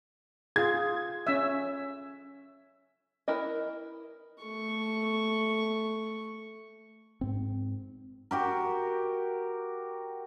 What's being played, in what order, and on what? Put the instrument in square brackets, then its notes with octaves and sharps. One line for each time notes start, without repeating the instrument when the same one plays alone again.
[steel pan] F4 G#4 [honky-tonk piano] G#6
[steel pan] C#4 E5
[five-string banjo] E4 A#4 B4 D#5
[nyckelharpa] A3 C#6
[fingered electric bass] G#2 C4
[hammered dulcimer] F#4 G4 A#4